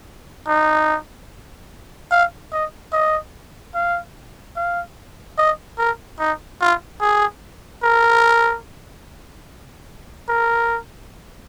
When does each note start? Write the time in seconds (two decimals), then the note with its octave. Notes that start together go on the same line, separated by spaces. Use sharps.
0.48 D#4
2.11 F5
2.52 D#5
2.93 D#5
3.74 F5
4.57 F5
5.38 D#5
5.78 A#4
6.19 D#4
6.61 F4
7.01 G#4
7.83 A#4
10.29 A#4